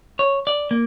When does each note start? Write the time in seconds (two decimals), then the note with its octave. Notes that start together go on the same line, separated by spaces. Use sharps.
0.19 C#5
0.47 D5
0.71 A#3